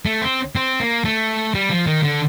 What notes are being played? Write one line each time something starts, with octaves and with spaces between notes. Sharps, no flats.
A3
C4
C4
A#3
A3
G3
F3
D#3
D3